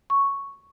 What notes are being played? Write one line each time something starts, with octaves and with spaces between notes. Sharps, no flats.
C#6